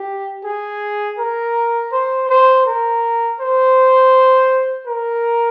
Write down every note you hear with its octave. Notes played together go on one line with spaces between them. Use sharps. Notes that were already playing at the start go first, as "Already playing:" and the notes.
Already playing: G4
G#4
A#4
C5
C5
A#4
C5
A#4